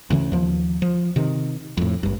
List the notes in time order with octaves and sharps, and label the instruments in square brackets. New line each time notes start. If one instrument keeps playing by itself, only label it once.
[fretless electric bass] D2 C#3 E3 C#4
D#2 F3
F3
C3 D#3
F2 A2
G#1 G2